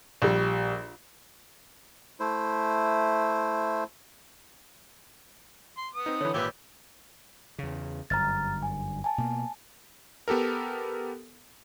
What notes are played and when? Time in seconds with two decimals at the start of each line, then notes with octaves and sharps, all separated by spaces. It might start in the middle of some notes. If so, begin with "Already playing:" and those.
0.22 A#1 G3
2.20 A3 E4 C5
5.78 C6
5.94 B3 D#6
6.06 C4 D#4 B4
6.21 D3 E3 C#5 B5
6.34 G#1 A#2 E4 G4 B4
7.58 E2 C#3
8.10 G1 F#2 A#5 F6 A6
8.63 G#5
9.04 G#5 A5
9.18 B2 A#3
10.28 B3 G4 A4 A#4